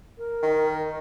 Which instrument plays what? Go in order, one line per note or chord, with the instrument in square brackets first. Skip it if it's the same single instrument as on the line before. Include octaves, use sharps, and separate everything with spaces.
[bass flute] A#4
[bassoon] D#3